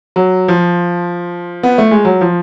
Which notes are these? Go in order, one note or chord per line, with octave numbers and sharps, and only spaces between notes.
F#3
F3
B3
A3
G#3
F#3
F3